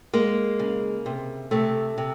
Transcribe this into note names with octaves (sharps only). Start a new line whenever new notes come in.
G#3 A#3
C#3
C3
C3 A3
C3